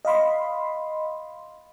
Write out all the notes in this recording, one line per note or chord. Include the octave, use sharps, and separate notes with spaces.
D#5 F5 B5 C6